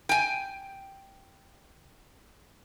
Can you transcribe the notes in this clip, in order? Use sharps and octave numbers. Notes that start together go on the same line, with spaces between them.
G5 G#5